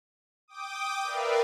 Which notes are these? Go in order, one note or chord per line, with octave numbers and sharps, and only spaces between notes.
G5 D6 D#6
A#4 B4 D5 E5 F5